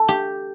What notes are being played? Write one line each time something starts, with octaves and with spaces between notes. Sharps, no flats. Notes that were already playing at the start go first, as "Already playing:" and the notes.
Already playing: A4
G4